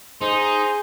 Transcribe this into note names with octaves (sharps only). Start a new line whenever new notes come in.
D#4 G#4 C5